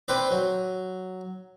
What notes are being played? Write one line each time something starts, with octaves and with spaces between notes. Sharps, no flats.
C4 B4 D5
F#3